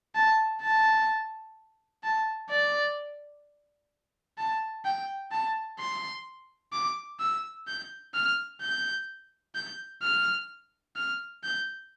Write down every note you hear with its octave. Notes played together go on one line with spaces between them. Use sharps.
A5
A5
A5
D5
A5
G5
A5
C6
D6
E6
G6
F6
G6
G6
F6
F6
G6